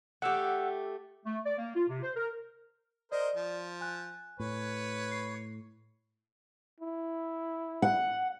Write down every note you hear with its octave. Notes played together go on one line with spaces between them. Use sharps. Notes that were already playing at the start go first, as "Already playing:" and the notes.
A3 G4 F#5 E6
A3
D5
A#3
F4
C3
C5
A#4
A#4 C5 D5 D#5
F3
G#5 F#6
A2 B4 C#5
C7
E4
F#5